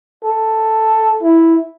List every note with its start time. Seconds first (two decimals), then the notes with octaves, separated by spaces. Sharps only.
0.24 A4
1.23 E4